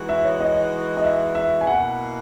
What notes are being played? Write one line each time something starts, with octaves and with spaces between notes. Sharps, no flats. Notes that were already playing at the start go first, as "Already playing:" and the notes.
Already playing: E3 G#3 D#4 F#4
E5
C#5
D#5
D#5
E5
E5
G#5
B2 A#3 E4 F#5